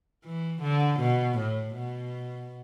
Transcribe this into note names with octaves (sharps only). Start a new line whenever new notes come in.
E3
D3
B2
A2
B2